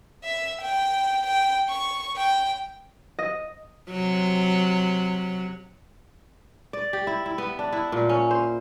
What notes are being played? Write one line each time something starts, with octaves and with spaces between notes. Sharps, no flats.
E5
G5
G5
C#6
G5
D#5
C3 F#3
D5
G4
E4
E4
B3
D4
E4
A#2
C#4
C5